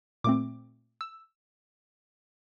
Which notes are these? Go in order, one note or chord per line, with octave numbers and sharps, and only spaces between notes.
A#2 A3 C4 D6
E6